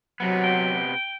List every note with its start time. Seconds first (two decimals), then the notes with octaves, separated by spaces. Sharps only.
0.20 C3 F#3 B3
0.44 G5